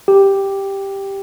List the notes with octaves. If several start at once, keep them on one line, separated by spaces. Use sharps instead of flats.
G4